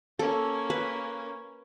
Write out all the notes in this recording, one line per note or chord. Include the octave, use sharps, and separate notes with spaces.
A#3 C#4 A4
B4